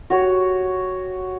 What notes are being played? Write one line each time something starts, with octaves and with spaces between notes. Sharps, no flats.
F#4 G4 C#5